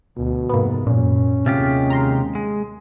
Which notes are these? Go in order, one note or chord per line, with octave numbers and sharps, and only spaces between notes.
D2 B2
F2 G#2 C3 A#3 B3
F#2 A#2 C#4
D#2 C3 G#3 F4 G4
A#5 C6
G#3